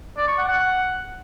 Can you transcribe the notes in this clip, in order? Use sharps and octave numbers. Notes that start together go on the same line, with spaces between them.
D5
C#6
F#5
F#5